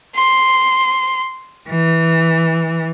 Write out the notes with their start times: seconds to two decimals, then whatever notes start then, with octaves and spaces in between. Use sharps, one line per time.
0.16 C6
1.68 E3